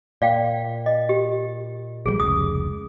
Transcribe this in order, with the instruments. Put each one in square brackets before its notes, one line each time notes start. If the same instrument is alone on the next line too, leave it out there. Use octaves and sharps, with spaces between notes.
[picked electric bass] A#2 [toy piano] D5 F5 G5
[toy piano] D#5
G4
[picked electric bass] A#1 D3 G3 [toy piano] G#4
[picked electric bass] F1 C#2 [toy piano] D#6